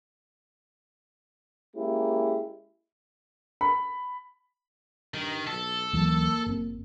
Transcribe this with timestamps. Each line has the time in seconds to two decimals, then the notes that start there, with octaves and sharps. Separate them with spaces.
1.75 G#3 A#3 C#4 E4 G4 G#4
3.61 B5
5.14 G2 D#3
5.47 B1 A4
5.93 D2 E3 F#3 A#3
6.46 F#1 C4